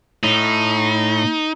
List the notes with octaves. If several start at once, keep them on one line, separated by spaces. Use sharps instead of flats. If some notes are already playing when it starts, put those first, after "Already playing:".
A2 D#4